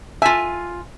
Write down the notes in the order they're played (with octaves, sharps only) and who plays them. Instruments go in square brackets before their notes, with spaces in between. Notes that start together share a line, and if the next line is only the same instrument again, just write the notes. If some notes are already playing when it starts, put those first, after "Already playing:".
[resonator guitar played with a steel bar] F4 G#5 [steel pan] E5